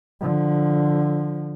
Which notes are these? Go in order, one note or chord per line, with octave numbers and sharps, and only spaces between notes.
D3 F3